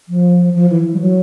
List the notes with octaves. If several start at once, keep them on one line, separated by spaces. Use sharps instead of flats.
F3
F3
E3
G3
F#3